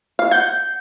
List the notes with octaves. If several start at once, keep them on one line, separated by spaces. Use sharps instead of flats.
F5
F#5 G6